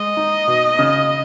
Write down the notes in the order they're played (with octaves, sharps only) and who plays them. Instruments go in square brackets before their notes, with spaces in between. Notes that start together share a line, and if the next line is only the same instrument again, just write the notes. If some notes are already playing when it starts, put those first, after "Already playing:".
Already playing: [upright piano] G#3 [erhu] D#5
[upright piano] D#4
B2
C#3